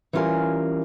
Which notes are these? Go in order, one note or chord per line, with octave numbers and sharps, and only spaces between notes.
E3 G3 C#4 F4 A#4 G#5